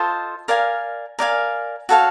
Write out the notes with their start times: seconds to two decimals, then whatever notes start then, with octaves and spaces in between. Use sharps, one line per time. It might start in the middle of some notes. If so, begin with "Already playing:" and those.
Already playing: F4 A4 C5 D#5
0.48 A#4 D5 F5 G#5
1.19 A#4 D5 F5 G#5
1.89 F#4 A4 C#5 F5